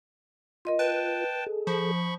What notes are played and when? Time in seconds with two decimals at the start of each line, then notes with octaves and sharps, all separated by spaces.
0.65 F4 A#4 D#5 C6
0.79 B4 G5 A5
1.47 G#4 A4
1.67 F3 B5 C#6